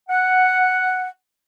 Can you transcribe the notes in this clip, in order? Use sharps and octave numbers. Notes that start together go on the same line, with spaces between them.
F#5